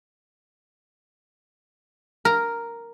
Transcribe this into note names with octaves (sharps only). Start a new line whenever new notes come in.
A#4